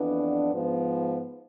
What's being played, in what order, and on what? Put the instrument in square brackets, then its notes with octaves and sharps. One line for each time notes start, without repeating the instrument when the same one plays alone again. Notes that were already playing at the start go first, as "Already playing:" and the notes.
Already playing: [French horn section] F2 E3 B3 D4
G#2 F3 B3